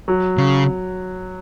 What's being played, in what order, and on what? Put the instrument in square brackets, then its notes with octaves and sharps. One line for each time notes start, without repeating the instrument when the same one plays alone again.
[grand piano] F#3
[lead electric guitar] C#3